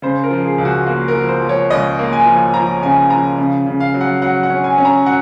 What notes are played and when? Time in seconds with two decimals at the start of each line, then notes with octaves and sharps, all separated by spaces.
0.02 C#3 C5
0.24 A#4
0.30 F3
0.44 G#4
0.58 C#2
0.65 F#4
0.86 A#3 F#4
1.08 A#4
1.15 F3
1.29 C5
1.42 F3
1.49 C#5
1.70 C#2 D#5
1.99 A#3
2.13 G#5
2.26 F3
2.54 F3 A#5
2.83 C#3 G#5
3.10 F3 A#5
3.38 C#3
3.67 C#3
3.80 F5
3.94 F#3
4.01 F#5
4.22 F#3 F#5
4.43 F#5
4.50 C#4
4.64 G#5
4.78 C#4
4.85 A#5
5.06 F#3 F#5